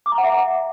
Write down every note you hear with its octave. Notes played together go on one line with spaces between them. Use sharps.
D6
A#5
F#5
E5